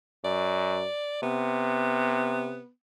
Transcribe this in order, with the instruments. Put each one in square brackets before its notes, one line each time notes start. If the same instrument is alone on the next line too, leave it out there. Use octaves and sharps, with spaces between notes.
[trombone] F#2 [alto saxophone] D5
[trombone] C3 [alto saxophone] B3